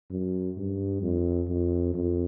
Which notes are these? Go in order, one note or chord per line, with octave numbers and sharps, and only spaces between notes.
F#2
G2
F2
F2
F2